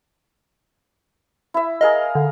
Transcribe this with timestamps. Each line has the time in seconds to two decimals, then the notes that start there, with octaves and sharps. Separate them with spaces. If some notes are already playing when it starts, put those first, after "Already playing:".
1.54 E4 E5
1.81 G#4 A#4 D#5 F5
2.15 D3